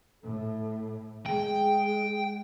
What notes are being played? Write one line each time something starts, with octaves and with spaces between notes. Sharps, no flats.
A2 A4
G#3 G#4 G5